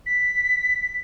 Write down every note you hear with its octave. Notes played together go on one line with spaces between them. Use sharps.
B6